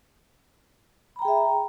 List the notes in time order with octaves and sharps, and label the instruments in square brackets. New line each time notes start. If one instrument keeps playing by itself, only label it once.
[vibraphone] B5
A#5
G5
G#4
E5